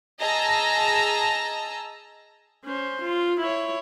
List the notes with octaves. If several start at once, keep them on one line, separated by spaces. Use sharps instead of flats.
G#4 D#5 A5 A#5 E6
C#4 C5
F4
E4 C#5